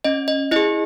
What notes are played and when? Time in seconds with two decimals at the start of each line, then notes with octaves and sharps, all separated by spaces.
0.04 C#4 D#5
0.28 D#5
0.51 E4 G#4 D#5